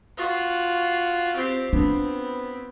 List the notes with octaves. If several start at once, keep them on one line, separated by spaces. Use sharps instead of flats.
F4 F#4
C4 G4
B3 C4 D4